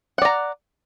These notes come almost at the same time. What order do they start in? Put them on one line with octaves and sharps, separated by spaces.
F#5 D5 A#5